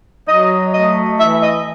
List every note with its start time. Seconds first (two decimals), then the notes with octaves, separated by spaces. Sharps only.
0.28 F#3 D#5
0.74 A3 D#5
1.19 E3 E5
1.42 D#5